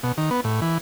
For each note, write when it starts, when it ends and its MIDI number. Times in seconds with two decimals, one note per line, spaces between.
0.03 0.12 47
0.18 0.30 51
0.31 0.41 59
0.44 0.60 45
0.62 0.78 52